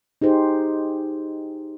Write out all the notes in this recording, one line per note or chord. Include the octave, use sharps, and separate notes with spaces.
D#4 G4 G#4 C5